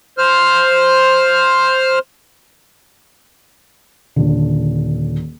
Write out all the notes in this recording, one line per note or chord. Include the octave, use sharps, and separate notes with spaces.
C5 F6
D#1 D3